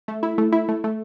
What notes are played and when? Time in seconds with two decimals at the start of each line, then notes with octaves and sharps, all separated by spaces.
0.08 A3
0.23 E4
0.38 A3
0.52 E4
0.69 A3
0.84 A3